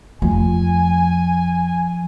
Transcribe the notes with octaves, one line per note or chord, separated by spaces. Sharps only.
F2 F3 A3 G#5